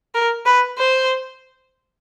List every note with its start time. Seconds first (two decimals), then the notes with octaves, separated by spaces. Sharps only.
0.15 A#4
0.46 B4
0.79 C5